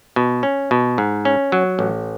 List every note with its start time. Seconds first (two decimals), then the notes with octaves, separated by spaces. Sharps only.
0.16 B2
0.43 C#4
0.71 B2
0.98 G#2
1.25 C#4
1.52 F#3
1.79 A1